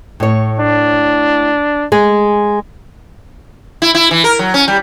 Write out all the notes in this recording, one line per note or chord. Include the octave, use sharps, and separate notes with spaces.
A2 C#5
D4
G#3 G#4
E4
E4
E3
A#4
F#3
C#4
G3